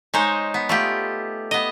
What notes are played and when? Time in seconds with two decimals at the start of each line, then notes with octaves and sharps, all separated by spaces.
0.14 G#3 D#4 C5 C#5
0.54 B3
0.69 A3 F4 G4
1.51 B3 D#5